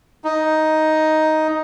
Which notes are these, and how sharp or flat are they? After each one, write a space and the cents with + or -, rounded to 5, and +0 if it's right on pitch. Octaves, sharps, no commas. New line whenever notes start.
D#4 +5